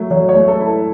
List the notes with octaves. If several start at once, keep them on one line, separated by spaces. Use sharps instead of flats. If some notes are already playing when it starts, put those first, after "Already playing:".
Already playing: F#3 A3
F#3 C#5
C#5
A3
A4
E4
A4